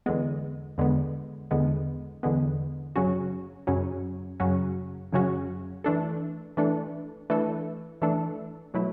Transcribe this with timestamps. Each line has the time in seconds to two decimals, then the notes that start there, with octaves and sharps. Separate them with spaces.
0.06 E2 D3 G#3 B3
0.78 E2 D3 G#3 B3
1.51 E2 D3 G#3 B3
2.23 E2 D3 G#3 B3
2.96 F#2 C#3 F#3 C#4 F#4
3.67 F#2 C#3 F#3 C#4 F#4
4.40 F#2 C#3 F#3 C#4 F#4
5.12 F#2 C#3 F#3 C#4 F#4
5.84 E3 A3 D4 A4
6.57 E3 A3 D4 A4
7.30 E3 A3 D4 A4
8.02 E3 A3 D4 A4
8.74 B2 F#3 A3 E4